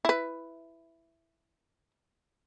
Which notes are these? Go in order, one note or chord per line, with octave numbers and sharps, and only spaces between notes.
E4 B4